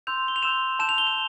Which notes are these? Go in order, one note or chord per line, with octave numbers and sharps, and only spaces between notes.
C6 E6 G6 F7
G7
F7
C6 E6 G6 E7
A5 E6 G6 E7
F7
G7
F7